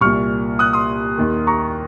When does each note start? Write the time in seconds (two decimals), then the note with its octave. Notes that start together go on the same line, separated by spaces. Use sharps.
0.01 C2 A#2 C#6 F6
0.59 D#6 F#6
0.73 C6 D#6
1.18 D#2 D#3
1.47 A#5 C#6